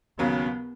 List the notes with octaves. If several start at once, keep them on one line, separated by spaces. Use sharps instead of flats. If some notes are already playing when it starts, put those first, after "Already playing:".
D#2 C#3 F#3 B3